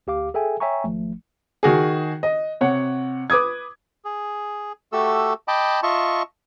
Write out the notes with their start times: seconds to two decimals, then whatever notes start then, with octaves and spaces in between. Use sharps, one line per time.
0.07 D2 G4 F5 D6
0.34 G#4 A4 E5 G5 G#5
0.60 C#5 E5 G5 G#5 A#5 C#6
0.84 G#1 F3 A3
1.63 D#3 F#4 G#4
2.23 D#5
2.61 C3 C#5 F#5
3.30 B4 D6 D#6 G#6
4.05 G#4
4.92 A3 F#4 G4 A4 E6
5.48 D#5 G5 A5 B5 D6
5.83 F4 D#5 E5 A5 C#6